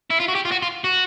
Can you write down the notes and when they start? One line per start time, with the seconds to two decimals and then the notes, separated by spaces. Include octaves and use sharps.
0.11 E4
0.20 F4
0.28 F#4
0.35 G4
0.45 F4
0.52 F#4
0.62 F4
0.84 F#4